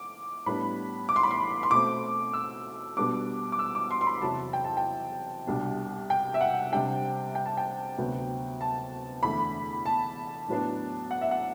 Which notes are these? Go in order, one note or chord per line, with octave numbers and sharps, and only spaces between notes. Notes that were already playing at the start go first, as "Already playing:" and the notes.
Already playing: D6
A2 G3 B3 D4 B5
D6
C6
B5
C6
C6
B2 A3 C4 D6
E6
B2 G3 B3 D4 D6
D6
E6
D6
C6
C6
B5
E2 C3 F#3 A5
G5
A5
G5
C2 B2 G3 D4
G5
E5
F#5
C3 G3 D4 G5
G5
A5
G5
D2 C3 F#3 B3
A5
E2 D3 A3 B5
A5
A2 F#3 B3 D4
F#5
E5
F#5